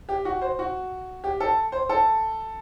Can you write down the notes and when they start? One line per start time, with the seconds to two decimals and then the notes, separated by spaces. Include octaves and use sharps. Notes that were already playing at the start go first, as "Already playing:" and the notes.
0.09 G4
0.25 F#4
0.42 C5
0.59 F#4
1.24 G4
1.40 A4
1.72 C5
1.89 A4